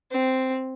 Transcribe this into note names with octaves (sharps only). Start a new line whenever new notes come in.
C4